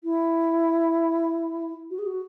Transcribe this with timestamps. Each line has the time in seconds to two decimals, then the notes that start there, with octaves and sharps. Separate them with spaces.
0.04 E4
1.90 F#4
1.98 G#4
2.06 F#4